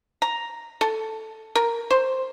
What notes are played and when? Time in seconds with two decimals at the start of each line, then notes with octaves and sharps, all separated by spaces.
0.22 A#5
0.81 A4
1.55 A#4
1.91 C5